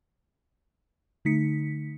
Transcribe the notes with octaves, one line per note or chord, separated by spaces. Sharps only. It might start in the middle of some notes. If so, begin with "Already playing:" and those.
D3 A3 D#4 B6 C#7